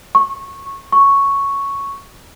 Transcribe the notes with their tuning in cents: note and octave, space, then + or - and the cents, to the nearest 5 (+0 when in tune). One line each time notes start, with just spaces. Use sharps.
C#6 -15
C#6 +0